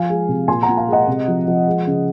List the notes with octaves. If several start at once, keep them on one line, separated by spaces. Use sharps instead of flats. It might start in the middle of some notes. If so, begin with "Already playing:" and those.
Already playing: F3 F5 G#5
G#3
C3
A#2 G#5 C6
F#5 A#5
A#2
F5 G#5
G#3
D#5 F#5
C3
F3
F3
G#3
C#3